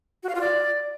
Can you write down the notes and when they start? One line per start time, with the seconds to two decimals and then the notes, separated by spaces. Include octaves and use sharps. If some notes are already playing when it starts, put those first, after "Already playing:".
0.23 F#4
0.29 F5
0.35 F4
0.41 D5